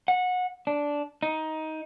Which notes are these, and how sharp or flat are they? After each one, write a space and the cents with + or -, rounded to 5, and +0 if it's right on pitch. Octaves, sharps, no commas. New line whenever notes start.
F#5 -25
D4 -10
D#4 +15